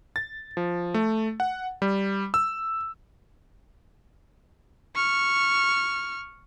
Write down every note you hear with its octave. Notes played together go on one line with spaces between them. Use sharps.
A6
F3
A3
F#5
G3
E6
C#6 F6